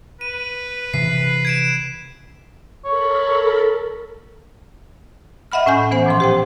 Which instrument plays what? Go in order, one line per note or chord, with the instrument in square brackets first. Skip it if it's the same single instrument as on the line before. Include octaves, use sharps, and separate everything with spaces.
[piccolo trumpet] B4 [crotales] D#7
[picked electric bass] C3 E3 [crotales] C7
[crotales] G#6 D7 E7
[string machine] A4 A#4 B5 [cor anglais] C#5
[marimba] D#5 E5 F#5 B5 F6
A2 C#4 G#5 G6
E3 B3 C5 F#5
A#2 F3 C6
G4 C5 G5